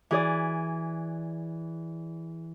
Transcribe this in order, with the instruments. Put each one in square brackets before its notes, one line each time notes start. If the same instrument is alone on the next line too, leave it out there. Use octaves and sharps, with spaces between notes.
[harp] E3 G#4 D5